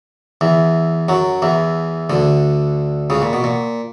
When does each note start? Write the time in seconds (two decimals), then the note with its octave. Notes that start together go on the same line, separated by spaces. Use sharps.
0.41 E2 E3
1.08 F#2 F#3
1.42 E2 E3
2.10 D2 D3
3.10 C#2 C#3
3.22 A#2
3.33 B2
3.44 A#2